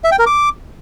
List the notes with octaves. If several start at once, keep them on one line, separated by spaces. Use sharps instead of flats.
E5
G5
A#4
D6